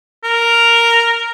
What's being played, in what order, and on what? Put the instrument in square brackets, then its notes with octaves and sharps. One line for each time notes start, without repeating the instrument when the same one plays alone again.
[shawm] A#4